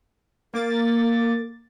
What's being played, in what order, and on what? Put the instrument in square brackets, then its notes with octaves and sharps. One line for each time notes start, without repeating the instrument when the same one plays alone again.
[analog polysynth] A#3 D6 A6 [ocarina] A#4